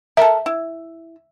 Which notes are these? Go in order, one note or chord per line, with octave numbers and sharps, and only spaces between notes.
A4 A#4 E5
E4